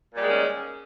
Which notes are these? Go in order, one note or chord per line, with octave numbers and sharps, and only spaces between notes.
A#2 D#3 G3 G#3 C#4